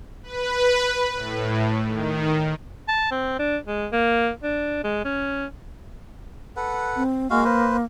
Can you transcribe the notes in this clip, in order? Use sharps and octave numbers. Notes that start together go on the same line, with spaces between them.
B4
A2
D#3
A5
C4
D4
G#3
A#3
D4
G#3
C#4
A4 B4 F#5
C4
G#3 A#3 F#4 F5
B4 C5